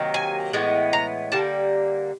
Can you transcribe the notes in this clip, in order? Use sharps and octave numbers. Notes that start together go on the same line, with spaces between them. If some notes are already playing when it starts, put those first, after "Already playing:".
Already playing: C3 D#3 F#3 A#3
G#5
A2 E3 G#3 B3
A#5
D3 G3 A#3 A5